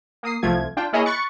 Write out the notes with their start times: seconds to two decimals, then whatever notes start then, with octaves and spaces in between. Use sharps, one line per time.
0.23 A#3 D#6 C7
0.43 C2 F3 A3 F4 G#6
0.77 D4 F4 G5
0.93 A#3 E4 G#4 C#5 D#5
1.06 B5 C#6 F#6 A6 C#7